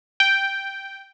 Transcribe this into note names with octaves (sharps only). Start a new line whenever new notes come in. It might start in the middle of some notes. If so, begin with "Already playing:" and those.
G5